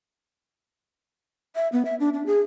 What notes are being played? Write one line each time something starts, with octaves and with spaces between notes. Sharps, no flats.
E5
B3
E5
D4
D4
G#4